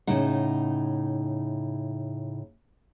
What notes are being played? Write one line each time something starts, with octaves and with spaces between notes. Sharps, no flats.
A2 C#3 D#4 F#5